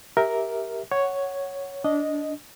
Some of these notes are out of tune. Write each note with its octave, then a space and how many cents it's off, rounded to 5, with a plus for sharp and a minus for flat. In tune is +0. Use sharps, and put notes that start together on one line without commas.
G4 +0 A#4 +0 E5 -15
C#5 +0 F#5 +5
D4 -15 D#5 +0